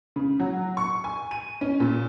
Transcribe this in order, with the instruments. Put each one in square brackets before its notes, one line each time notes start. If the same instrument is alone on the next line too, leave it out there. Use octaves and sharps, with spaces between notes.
[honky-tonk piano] C#3
F#3
C#6
G#5
D#7
C#4
A#2